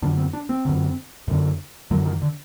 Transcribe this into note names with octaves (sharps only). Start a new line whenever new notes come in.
F#2 D3 D4
C4
D4
C4
F#2 D3
F#2 D3
F#2 D3 F#3
D#3
D3